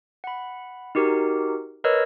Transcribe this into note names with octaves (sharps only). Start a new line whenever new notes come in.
F#5 B5
D#4 F#4 G4 A#4
A#4 B4 C#5 D#5 E6